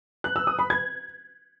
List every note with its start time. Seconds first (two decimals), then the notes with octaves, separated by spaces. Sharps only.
0.24 F#6
0.36 E6
0.47 D#6
0.59 B5
0.70 G#6